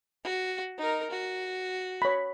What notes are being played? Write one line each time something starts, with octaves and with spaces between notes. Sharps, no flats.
F#4
D#4 A#4
F#4
C#5 B5